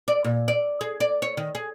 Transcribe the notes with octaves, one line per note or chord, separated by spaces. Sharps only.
D5
A#2
D5
G#4
D5
C#5
D#3
G#4